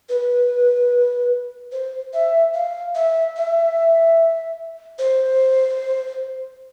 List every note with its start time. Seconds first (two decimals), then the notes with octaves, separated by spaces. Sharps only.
0.09 B4
1.72 C5
2.13 E5
2.54 F5
2.95 E5
3.36 E5
4.99 C5